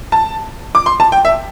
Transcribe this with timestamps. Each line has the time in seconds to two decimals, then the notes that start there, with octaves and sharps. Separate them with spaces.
0.12 A5
0.75 D6
0.86 C6
1.00 A5
1.12 G5
1.25 E5